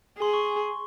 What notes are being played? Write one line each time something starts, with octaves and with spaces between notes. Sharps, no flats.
G#4 C6
C#6